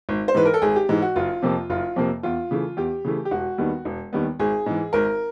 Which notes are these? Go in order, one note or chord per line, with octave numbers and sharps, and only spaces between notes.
G#1
C5
G#2 E3 B4
A#4
A4
G#1 G#4
G4
G#2 E3
F#4
F#1 F4
F2 C3 F3 A#3
F#1 F4
F2 C3 F3 A#3
E2 F4
C#3 E3 A3
E2 G4
C#3 E3 A3
G4
E1 F#4
D#2 D#3 G3 B3
E1
D#2 D#3 G3 B3
G#1 G#4
G#2 E3
G#1 A#4